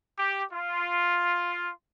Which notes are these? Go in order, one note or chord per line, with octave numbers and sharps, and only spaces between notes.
G4
F4